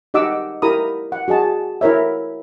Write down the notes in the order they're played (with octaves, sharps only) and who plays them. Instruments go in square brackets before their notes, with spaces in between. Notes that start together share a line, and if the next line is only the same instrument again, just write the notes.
[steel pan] D#4 G4 D#5 F#5 D6 E6
E4 G4 A#4 A#5 B5 D#6
F#5
F#4 G#4 D#5 A5
E4 A#4 C#5 E5